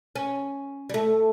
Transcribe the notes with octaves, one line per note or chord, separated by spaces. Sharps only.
C#4
G3
A3